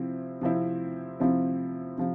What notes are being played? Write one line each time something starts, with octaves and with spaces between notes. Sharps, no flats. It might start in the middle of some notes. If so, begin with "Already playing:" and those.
Already playing: C3 F3 C4 E4
C3 F3 C4 E4
C3 F3 C4 E4
C3 F3